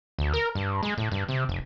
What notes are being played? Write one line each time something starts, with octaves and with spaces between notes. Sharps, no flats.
D2
A#4
G2
G#3
A2
G2
C3
F1